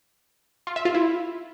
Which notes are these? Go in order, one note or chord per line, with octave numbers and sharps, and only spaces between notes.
F4
E5
F4
E4